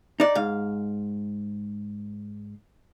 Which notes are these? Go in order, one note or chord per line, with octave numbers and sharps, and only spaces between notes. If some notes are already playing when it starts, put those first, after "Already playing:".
D#4 D5
G#2 F5